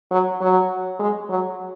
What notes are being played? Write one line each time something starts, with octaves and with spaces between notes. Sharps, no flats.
F#3
F#3
G#3
F#3